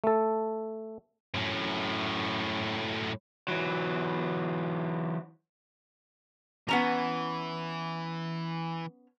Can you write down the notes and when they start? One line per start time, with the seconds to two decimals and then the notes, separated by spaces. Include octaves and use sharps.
0.04 A3 A4
1.34 F#2 A2
3.48 E3 F#3
6.69 E3 B3 C#4 A#5